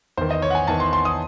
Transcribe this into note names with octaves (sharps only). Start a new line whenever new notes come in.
E2 D#3 C5
D#5
C#5
F#5
G#5
E2 D#3 A5
C6
C6
D#6